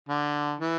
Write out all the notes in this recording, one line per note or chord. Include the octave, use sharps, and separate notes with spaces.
D3
E3